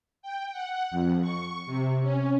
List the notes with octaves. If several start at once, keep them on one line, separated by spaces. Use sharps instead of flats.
G5
F#5
F2
C#6
C3
C#4